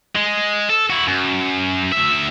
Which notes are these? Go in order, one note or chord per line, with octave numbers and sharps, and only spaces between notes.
G#3
A4
E4 F#4
F#2
D2 E5